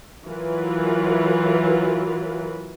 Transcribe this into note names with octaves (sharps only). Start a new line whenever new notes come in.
E3 F#3 F4 A#4 B4